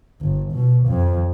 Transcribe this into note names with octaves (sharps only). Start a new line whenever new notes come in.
G1
B2
F2